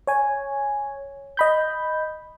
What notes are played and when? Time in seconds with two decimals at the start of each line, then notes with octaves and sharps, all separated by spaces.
0.07 C#5 G#5
1.37 D#5 B5 G6